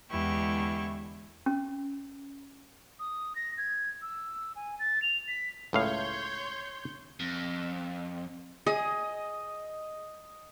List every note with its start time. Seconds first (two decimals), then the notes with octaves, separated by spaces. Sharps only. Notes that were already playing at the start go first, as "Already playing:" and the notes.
0.10 E2 D3 G#3 E4 G4 C#6
1.46 C#4
2.99 D#6
3.35 A#6
3.58 G#6
4.02 E6
4.56 G#5
4.79 A6
5.02 F7
5.28 B6
5.73 C#2 A2 C#5 F5 C6 G6
7.20 F2
8.66 G#4 D#5